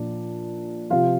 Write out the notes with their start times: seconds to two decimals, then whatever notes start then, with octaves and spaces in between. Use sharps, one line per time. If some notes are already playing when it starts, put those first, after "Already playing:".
Already playing: A#2 F3 D4
0.90 C3 F3 F4 F5